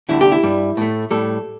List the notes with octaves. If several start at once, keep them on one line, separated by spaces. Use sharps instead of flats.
D2 D3 G3 E4
G4
E4
G2 G3
A2 A3
A2 G3 A4